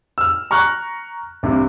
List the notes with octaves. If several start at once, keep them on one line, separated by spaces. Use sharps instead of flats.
E6 F6
A#5 C#6 F6 F#6
C2 G2 C3